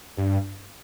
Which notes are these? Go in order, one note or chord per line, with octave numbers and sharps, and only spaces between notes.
G2